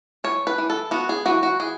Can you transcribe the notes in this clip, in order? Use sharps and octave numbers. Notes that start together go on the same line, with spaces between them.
E3 C#5
B4
E3
A4
B3 F#4
G#4
E3 F#4
F#4
E3 G#4